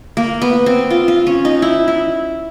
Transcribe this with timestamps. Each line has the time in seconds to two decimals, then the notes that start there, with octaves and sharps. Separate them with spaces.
0.17 A#3
0.42 B3
0.66 C4
0.90 F4
1.08 F4
1.27 C#4
1.45 D#4
1.62 E4
1.88 E4